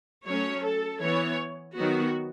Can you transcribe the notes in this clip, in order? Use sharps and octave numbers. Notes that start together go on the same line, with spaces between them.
F#3 A3 C#4 C#5
A4
E3 B3 C#5
D#3 F#3 B3 F#4